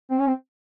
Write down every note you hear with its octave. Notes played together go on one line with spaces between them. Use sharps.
C4
C#4
C4